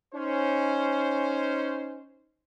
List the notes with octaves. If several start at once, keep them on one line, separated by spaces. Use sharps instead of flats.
C#4 D#4 C5